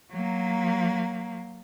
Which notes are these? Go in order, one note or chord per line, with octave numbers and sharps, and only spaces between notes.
F#3 A#3